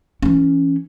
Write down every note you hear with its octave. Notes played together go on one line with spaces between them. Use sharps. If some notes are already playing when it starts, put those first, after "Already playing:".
E3 C#4